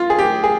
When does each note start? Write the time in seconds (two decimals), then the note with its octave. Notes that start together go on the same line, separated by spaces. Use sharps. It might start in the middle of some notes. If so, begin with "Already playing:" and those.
Already playing: F4
0.10 G#4
0.19 G4
0.44 G#4